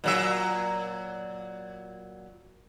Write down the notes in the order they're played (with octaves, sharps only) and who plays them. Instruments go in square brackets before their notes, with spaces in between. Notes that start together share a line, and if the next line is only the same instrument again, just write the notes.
[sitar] A#2 F#3 E5